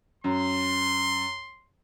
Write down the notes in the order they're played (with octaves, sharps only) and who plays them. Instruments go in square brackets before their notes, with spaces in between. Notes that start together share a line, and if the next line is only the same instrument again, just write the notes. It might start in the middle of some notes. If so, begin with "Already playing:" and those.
[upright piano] F#2 [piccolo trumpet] C6